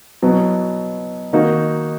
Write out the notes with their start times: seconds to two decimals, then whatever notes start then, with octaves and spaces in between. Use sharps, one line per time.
0.22 B2 F#3 B3 E4
1.33 D#3 A#3 D#4 F#4